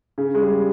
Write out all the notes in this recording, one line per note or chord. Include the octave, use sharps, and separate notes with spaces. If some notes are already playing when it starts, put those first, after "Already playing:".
C#3
G#3
G3